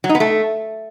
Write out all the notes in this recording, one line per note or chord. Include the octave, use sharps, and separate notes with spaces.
F#3
D#4
B3
A3